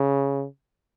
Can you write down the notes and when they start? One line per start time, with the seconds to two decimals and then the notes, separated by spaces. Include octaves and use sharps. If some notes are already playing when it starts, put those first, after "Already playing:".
Already playing: C#3